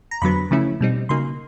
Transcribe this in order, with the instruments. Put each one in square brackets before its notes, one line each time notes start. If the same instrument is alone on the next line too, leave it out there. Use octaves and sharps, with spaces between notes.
[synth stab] A#5
F2 D3 F#3 B3 B5
C#3 F3 A3 C#4 E4
B2 G3 C4 D#4
C#3 F#3 A#3 D#4 C6